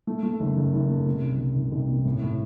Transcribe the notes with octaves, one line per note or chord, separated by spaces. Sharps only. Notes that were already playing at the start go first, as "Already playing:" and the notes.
A3
A3
F#1
F#1
F#1
A3
C3
C2
C2
C2
C2
C3
A2
A2